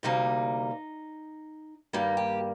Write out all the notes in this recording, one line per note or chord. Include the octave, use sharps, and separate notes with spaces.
D2 C3 G3 A#3 D#4
G2 D#3 G3 A#3 D#4
G4